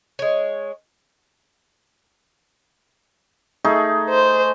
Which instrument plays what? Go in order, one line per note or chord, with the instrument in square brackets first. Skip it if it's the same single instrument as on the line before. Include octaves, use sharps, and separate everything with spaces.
[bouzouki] G#3 C#5
[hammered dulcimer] A3 D#4 G#4
[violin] C5